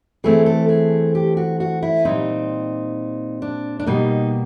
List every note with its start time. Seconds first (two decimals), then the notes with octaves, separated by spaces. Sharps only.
0.24 E3 A3 C4 G#4
0.46 A4
0.69 G#4
1.15 G4
1.37 F#4
1.60 F#4
1.82 E4
2.05 A#2 G3 C4 D#4
3.42 D4
3.80 D4
3.86 B2 G3 A#3 D#4